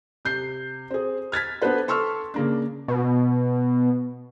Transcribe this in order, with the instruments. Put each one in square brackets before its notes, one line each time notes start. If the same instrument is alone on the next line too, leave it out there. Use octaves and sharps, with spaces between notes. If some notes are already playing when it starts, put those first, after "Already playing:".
[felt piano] C3 G6 C7
C4 G#4
F6 G#6 A6 B6
B3 D4 A4 B4 C5
A4 C6 C#6 E6 F6
C#3 A#3 D4
[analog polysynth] B2